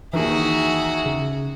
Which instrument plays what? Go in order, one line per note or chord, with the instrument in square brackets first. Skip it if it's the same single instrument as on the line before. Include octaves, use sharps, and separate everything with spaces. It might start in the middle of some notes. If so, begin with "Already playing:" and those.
[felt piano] D#2 D#3 A#4 [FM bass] E3 [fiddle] F#4 G#4 [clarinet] E5
[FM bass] C#3